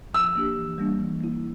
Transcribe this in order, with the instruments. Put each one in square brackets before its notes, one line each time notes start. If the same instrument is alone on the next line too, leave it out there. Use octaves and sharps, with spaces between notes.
[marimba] F3 [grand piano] E6
[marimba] A#3 D4 G4
E3
G3 A#3 D4
E3
A#3 E4